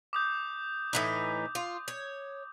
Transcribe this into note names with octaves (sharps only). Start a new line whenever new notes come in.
D6 D#6 G6
A2 E3 D#4
F4
C#5